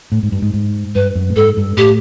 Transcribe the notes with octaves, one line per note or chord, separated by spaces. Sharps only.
A2
G#2
G2
G#2
G#2
G2 B4
F#2
A2
G#2 A4
G2
A2 G4